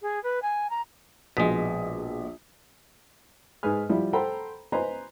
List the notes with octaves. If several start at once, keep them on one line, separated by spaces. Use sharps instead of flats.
G#4
B4
G#5
A#5
A#1 B2 G#3 D#6 B6
G#2 G#4 B4 G#5 F6
F3 G3 E4
A4 C5 F#5 G5 A#5 B5
B4 C5 D#5 G#5 A#5